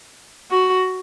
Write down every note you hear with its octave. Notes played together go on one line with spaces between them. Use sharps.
F#4